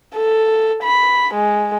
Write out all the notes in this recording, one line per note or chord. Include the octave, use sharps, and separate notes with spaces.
A4
B5
G#3